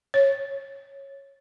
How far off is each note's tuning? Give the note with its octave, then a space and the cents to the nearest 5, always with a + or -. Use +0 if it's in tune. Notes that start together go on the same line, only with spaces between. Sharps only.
C#5 -15